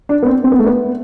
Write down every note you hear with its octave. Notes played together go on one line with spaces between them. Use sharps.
D4
B3
C4
C4
B3
A3
B3